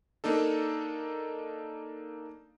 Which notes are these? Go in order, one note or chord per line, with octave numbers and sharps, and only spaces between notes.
A#3 D4 D#4 A4